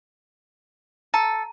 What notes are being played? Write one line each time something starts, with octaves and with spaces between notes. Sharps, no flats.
A4 A#5